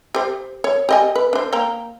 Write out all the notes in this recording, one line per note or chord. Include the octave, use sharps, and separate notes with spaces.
G4 C5
C#5
G4 D#5 G#5
B4
D4 C5
A#3 G5 A#5